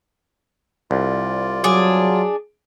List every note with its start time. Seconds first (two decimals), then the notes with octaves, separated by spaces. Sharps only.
0.91 C2 F4 D5
1.64 F#3 D4 G#4